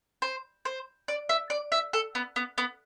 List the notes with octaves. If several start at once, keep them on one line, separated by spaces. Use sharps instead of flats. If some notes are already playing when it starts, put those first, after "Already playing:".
C5
C5
D5
E5
D5
E5
A4
B3
B3
B3